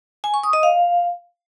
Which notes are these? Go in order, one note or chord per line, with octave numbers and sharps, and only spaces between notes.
G#5
C#6
D#6
D#5
F5